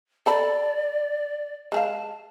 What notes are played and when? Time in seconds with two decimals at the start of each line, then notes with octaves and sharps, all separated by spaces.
0.26 A4 D5 A5 B5
1.72 G#3 G#4 F5 A5